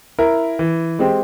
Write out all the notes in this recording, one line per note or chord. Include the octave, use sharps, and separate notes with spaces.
E4 A#4
E3
G#3 C4 G4